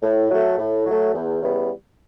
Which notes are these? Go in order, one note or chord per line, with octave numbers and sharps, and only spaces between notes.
A2
F#3 A3
A2
F#3 A3
E2
C#3 E3 G3 B3